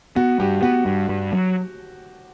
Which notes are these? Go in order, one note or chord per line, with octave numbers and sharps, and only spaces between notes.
B3 F#4
G2 G4
B3 F#4
G2
G2
F#3